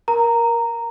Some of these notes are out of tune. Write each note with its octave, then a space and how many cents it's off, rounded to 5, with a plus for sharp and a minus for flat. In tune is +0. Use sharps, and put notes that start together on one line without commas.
A#4 +15 A#5 -10